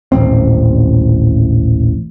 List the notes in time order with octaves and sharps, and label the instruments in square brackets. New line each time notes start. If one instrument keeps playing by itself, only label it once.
[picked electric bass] D#1 A1 C4